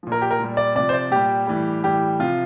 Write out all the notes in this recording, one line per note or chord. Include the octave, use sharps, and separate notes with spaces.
A#2 F3
A#4
G4
A#4
A#2 G3
D5
C3 F3 D5
C5
D5
A#2 G3 G4
A2 E3 G3
A2 E3 G3 G4
C3 F3 F4